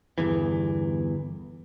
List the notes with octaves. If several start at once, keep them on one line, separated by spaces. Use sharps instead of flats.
G1 E2 E3